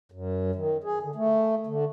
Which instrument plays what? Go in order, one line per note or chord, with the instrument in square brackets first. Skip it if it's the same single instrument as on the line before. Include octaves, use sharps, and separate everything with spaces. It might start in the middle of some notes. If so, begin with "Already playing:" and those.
[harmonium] F#2
D#3
G#4
D3
A3
D3